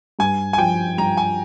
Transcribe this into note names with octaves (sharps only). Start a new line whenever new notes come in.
G2 G#5
G#5
F3 G5
G2 A#5
G#5